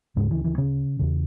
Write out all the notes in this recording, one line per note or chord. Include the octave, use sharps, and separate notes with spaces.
D2 G#2 C#3 G#3
E3
E3
C#3 C#4
E2 C#3